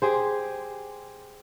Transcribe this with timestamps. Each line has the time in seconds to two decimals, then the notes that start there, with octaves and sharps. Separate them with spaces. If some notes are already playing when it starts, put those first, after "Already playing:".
0.02 G4 G#4 C5